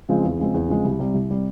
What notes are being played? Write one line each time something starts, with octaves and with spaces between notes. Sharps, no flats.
C#3 F3 G#3 C4
E2
C#3 F3 G#3 C4
E2
C#3 F3 G#3 C4
C2
C3 G3
C2
C3 G3